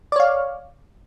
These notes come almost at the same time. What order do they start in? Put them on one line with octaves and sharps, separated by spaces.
D5 C#5 F5